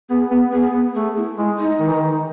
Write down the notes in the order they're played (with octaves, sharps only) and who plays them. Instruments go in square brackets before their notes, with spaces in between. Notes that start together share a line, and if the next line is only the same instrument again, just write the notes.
[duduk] B3 [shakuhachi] G#4
[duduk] B3
[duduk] B3 [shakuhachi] G#4
[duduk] B3
[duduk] A3 [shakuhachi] G#4
[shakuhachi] E4
[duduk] G#3 [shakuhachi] E4
[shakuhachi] D#4
[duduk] D#3
E3
D#3